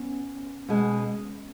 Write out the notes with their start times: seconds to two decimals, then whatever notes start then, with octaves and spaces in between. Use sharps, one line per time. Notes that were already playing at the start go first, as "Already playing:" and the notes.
Already playing: B3 C#4
0.69 B2 G#3